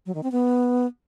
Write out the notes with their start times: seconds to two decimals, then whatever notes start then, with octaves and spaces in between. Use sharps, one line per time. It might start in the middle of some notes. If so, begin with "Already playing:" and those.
0.06 F#3
0.15 D#3
0.23 C4
0.32 B3